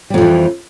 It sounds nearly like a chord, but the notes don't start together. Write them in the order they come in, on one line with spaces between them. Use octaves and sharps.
G3 F2 F3 E3